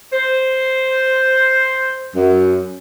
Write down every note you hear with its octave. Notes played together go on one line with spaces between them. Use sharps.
C5
F#2